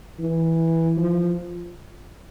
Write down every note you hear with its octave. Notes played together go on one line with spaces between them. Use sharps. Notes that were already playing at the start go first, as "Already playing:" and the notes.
E3
F3